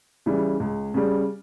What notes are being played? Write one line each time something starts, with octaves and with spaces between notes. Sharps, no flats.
C#3 E3 G3
C#2
C#3 G3